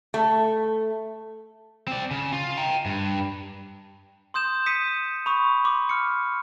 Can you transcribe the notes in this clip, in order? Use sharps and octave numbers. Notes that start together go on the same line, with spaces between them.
A3
C4 D5
C#3
F4
G5 A#5
G2
C6 D#6 G6 E7
D#6 B6 C#7 D#7
B5 C#6 D#6
C6 D6
F6 C#7